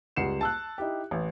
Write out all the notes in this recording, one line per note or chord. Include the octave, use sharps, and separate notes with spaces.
C#2 G3 F#5 C7 C#7 E7
A5 E6 F#6
D#4 E4 G4
A1